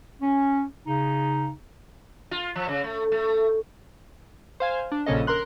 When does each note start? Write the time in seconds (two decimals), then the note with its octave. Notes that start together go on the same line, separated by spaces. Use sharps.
0.22 C#4
0.87 C#3 D#4
2.31 F4
2.55 F3
2.68 C#3
2.84 A3
3.12 A3
4.60 C5 F5 G#5
4.92 D4
5.06 A#1 C#3 C#4 A4 D#5
5.27 A#4 A#5 C6 F#6